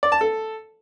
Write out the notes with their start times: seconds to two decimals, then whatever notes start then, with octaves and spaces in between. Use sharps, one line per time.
0.03 D5
0.12 A5
0.21 A4